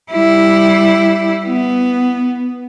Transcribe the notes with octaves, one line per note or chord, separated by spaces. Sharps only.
G3 E4
B3